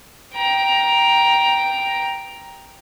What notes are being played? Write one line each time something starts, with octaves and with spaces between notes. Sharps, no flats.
G5 A#5